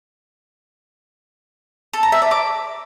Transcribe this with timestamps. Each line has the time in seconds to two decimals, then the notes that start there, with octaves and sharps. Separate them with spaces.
1.93 A4
2.03 A#5
2.12 E5
2.22 D5
2.31 D6